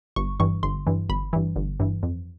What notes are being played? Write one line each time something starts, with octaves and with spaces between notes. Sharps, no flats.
G1 C#6
G2 E3 C#6
G1 C6
G2 E3
G1 B5
G2 E3
G1
G2 E3
F2